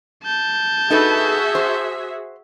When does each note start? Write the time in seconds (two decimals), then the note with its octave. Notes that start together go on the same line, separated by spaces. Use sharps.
0.24 A5 G6
0.90 D#4 F#4 G#4 A4 B4 E5
1.55 C5